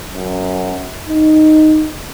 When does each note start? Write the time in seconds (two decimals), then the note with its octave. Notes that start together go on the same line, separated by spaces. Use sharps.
0.13 F#2
1.08 D#4